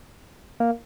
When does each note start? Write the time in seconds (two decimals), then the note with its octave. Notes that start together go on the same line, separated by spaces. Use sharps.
0.60 A#3